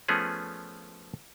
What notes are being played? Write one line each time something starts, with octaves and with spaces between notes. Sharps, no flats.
F3 A3 B3 C#4 G#4